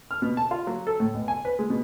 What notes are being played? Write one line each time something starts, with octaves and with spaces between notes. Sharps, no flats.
F6
B2
A5
F4
F#3
A4
A2
B1
G#5
B4
G#3
B2